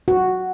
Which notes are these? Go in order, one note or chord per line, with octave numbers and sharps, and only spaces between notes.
F#4